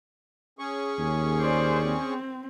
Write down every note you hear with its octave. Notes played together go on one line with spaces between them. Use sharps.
C#4 G#4 C#6
D#2
C5 D5
C4